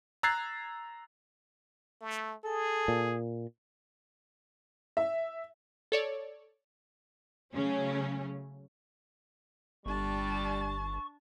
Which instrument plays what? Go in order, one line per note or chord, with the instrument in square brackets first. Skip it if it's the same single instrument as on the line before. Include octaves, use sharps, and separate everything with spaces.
[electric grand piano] A#5 E6 F#6 G#6 A6 C7
[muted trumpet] A3
[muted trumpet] G#4 [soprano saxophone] A4
[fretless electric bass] A#2
[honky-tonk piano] E5
[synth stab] A4 C#5 D5
[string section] C#3 F#3 A3 C#4
[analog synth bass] G1 [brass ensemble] G3 [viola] D4 A5 [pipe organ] C#6